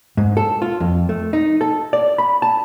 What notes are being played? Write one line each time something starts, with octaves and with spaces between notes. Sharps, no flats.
G#2
A4
F4
F2
A3
D#4
A4
D5
B5
A5